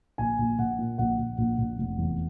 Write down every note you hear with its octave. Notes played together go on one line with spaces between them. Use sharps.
A#1 G#5
A#1
A#1 F#5
A#2
A#1 F#5
A#1
A#1
A#1
F1
E2